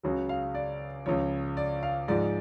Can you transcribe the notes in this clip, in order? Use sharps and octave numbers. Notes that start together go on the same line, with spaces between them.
C#2 C#3 F#3 F#4
F5
D5
C#2 C#3 F3 C#5
D5
F5
G#2 F3 G#3 D5